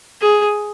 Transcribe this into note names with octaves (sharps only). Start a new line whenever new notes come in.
G#4